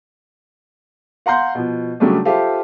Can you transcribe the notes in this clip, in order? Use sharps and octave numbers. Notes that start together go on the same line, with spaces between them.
F5 F#5 A#5 C6 G6
B2 F3
C#3 F#3 G3 A3 C#4 D4
F4 G4 A4 C5 E5 F5